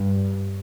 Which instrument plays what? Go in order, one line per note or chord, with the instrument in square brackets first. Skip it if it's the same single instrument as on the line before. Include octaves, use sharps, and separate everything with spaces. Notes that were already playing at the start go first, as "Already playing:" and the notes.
Already playing: [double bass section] G2